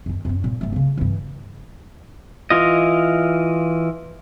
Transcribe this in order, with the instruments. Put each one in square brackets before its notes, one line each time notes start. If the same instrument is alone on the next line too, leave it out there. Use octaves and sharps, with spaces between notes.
[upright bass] F#2 D#3
F#2 C4
G2 A#2
G1 A3
C#3 A#3
G2 E3
[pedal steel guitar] E3 F4 D#5